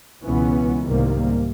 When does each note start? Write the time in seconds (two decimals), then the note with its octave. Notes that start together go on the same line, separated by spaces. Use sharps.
0.24 C#2 B2 E3 B3 C#4
0.84 C2 G#2 C3 D#3 G3 A#3